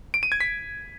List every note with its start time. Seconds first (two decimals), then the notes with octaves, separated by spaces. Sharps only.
0.14 D7
0.23 D#7
0.32 G#6
0.41 B6